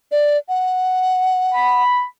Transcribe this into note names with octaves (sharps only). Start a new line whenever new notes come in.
D5
F#5
B5